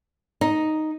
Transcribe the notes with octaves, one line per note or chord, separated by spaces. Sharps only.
D#4